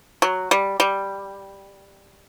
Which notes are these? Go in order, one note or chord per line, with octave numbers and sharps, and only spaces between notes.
F#3
G3
G3